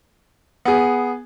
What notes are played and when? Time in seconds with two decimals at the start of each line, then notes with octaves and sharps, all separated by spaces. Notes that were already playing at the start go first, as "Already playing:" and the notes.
0.65 B3 G#4